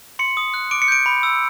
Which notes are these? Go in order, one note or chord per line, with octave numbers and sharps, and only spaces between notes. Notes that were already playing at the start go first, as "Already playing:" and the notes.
C6 C#7
D#6
F#6
D6 D7
C#7
G6 D7
B5
E6